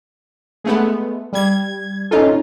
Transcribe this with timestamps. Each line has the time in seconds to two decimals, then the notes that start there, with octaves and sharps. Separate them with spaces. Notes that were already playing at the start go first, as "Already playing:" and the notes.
0.64 G#3 A3 B3
1.33 G3 G#6
2.11 C#4 D#4 F4 A4